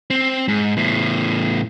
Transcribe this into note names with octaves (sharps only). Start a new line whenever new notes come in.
C4
G#2
E2 A2